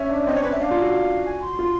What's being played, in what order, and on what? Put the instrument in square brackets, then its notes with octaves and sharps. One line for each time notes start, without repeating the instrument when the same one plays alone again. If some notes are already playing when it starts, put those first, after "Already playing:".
Already playing: [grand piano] C#4 [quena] E5
[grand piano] D4
[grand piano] C4 [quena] D#5
[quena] C#5
[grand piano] C#4 [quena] B4
[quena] E5
[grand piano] D4 [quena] F5
[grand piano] F4
F#4
[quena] G#5
C6
[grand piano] F4